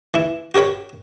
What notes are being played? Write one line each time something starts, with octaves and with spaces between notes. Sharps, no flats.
E3 E4
F#4 G4 A#4 C#5 B5